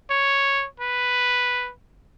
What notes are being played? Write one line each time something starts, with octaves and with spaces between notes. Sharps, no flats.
C#5
B4